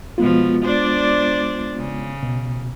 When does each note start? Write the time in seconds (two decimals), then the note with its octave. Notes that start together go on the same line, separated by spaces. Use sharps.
0.18 B2 F3 G#3 B3 F4
0.64 D4 C5 D5
1.76 C#3
2.23 B2